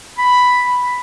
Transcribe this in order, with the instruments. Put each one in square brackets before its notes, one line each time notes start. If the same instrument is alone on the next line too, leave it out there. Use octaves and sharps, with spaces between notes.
[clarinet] B5